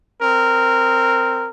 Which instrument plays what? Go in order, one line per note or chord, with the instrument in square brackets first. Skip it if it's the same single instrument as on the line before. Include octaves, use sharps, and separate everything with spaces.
[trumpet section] C4 A#4